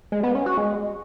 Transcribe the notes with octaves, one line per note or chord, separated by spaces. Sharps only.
G#3
B3
C#4
F#4
G#3